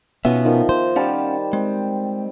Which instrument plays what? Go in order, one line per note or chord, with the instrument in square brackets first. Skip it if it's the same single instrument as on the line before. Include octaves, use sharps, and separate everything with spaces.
[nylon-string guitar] B2 B3 C#4 [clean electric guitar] D#4 F4 E5
[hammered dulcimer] D#3 F3
[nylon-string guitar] C5
[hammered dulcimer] G3 A5 [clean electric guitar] C#4 F5 F#5
[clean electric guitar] G#3 [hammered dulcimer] C4